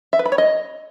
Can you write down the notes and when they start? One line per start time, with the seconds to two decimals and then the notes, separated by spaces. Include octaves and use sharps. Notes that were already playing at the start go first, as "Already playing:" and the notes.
0.13 E5
0.19 B4
0.26 B5
0.32 C#5
0.38 D#5